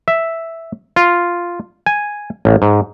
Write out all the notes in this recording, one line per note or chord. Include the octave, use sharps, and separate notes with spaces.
E5
F4
G#5
A1
G#2